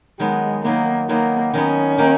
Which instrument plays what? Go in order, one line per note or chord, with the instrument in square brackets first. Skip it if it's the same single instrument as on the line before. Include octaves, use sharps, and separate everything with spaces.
[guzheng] D#3 F#3 B3 [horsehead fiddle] G#3
[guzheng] D#3 F#3 B3 [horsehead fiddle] A#3
[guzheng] D#3 F#3 B3 [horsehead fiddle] A#3
[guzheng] D#3 F#3 B3 [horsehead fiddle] C#4
[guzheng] D#3 A#3 D#4